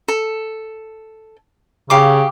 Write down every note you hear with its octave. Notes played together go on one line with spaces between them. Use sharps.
A4
C#3 G4 F5 D6